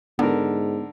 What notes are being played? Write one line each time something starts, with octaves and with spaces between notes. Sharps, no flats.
G#2 D3 B3 A#4